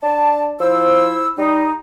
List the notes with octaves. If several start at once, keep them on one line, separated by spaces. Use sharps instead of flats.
D4 A5
F3 E4 C5 E6
G3 D#4